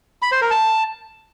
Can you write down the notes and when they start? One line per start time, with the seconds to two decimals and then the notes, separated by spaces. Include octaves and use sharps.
0.22 B5
0.32 C5
0.41 A#4
0.51 A5